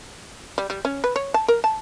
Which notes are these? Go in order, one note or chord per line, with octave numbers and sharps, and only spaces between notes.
G3
G3
C#4
B4
C#5
A5
A#4
A5